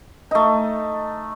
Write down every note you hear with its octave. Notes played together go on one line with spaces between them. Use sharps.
A3 D#4